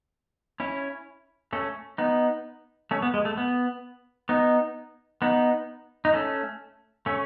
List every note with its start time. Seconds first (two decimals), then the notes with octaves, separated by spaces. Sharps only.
0.60 C#4 E4
1.53 A3 C#4
1.98 B3 D#4
2.91 A3 C#4
3.02 B3
3.14 G#3
3.25 A3
3.37 B3
4.29 B3 D#4
5.22 B3 D#4
6.05 D#4
6.13 A3 C#4
7.06 A3 C#4